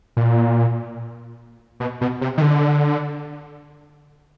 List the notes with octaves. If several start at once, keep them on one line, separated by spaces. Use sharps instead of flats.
A#2
B2
B2
C3
D#3
D3